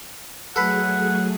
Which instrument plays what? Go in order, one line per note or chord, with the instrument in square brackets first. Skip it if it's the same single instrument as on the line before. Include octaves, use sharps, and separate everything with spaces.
[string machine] F#3 A3 G#4 [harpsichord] A4 B4 [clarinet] F#5